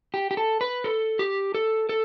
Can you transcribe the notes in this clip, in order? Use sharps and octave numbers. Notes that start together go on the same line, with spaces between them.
G4
G4
A4
B4
A4
G4
A4
A4